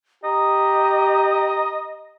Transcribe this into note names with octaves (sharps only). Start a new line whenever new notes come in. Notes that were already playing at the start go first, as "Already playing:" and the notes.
G4 D#5 A#5